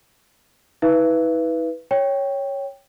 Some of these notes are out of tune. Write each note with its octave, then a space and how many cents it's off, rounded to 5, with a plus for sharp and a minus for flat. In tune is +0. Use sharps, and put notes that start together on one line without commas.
E4 -45 B4 +0 E5 +40
C#5 +0 G5 +0